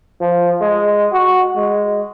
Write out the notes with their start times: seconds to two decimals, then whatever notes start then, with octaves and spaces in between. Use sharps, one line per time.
0.21 F3
0.61 G#3
1.12 F#4
1.56 G#3